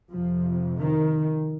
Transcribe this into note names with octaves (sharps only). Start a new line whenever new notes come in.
F2 C3 F3
D#3